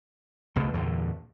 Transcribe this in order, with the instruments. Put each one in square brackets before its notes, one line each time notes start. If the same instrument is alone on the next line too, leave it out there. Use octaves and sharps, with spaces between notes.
[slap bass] C#2 B2 A3
E2 G2 A#2 D3